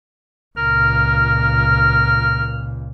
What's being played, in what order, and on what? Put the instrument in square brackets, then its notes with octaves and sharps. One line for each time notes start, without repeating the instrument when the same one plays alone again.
[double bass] C#2 A#2 [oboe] A#4 [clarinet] F6